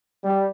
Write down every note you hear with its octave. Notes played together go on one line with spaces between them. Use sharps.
G3